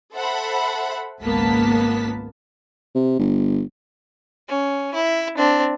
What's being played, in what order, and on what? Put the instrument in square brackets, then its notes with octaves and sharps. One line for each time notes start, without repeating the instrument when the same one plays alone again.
[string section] A4 C5 E5 F#5 B5
G#1 C#2 A#3 B3 A5 B6
[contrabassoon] C3
G1
[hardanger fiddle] C#4
E4
C4 D4